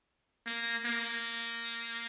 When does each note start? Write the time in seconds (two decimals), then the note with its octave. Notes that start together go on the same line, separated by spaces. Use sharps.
0.47 A#3
0.86 A#3